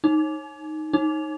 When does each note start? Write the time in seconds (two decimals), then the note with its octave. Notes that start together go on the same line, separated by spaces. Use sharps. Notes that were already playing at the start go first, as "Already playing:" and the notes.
0.04 D#4
0.93 D#4